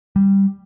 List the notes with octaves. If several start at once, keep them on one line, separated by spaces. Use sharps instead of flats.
G3